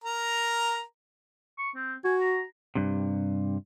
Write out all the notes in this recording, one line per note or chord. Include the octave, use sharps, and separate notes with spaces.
A#4 A#5
C#6
C4
F#4 G#5
A#5
G2 C3